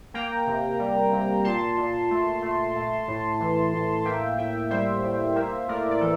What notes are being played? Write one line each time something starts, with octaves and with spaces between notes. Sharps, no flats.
A#3 G5 A#5
C3
G3
C3
A#2 A5 C6
A#2
A3
A3
A3
A2
E3
A2
A#3 E5 G5
A2 E5 G5
G3 C5 E5
A2
A#3 C5 E5
A2 A#4 D5
D5
E3 A4